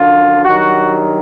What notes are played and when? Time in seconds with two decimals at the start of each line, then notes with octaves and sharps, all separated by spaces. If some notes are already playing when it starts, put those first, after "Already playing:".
Already playing: F#2 D3 F3 F4
0.45 G2 D#3 F#3 F#4